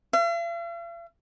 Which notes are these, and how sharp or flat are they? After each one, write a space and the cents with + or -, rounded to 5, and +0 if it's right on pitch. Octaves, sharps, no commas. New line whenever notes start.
F5 -45